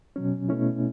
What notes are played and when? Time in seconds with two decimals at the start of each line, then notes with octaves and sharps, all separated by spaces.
0.16 B2 F#3 C#4
0.49 B2 A3 C#4 E4